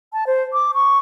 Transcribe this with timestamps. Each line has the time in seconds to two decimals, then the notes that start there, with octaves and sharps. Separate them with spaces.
0.13 A5
0.27 C5
0.53 D6
0.74 C#6